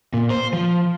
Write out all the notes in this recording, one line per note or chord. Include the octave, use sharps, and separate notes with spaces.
A#2
C5
F3